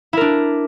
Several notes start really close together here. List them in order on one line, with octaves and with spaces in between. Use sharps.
E4 A#4 D4